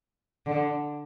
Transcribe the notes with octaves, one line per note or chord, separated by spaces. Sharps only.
D3